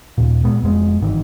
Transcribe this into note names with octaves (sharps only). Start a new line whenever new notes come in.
D#2 A#2
A#2 G#3 B3
F1 F2 G#3 B3
G1 G#2 D#3 E3